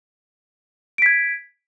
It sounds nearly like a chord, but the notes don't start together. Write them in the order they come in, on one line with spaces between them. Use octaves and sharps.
D7 B6 G#6